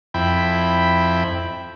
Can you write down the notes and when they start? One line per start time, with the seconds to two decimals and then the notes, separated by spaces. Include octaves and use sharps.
0.14 F2 E4 G5 B5